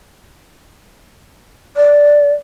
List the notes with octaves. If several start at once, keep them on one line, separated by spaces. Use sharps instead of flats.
D5